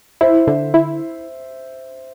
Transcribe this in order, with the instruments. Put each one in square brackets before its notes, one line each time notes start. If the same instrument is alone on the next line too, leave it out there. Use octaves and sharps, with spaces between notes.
[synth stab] E4 [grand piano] C5 E5
[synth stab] D3
E4